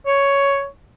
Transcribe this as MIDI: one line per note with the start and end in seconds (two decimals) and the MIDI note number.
0.06 0.67 73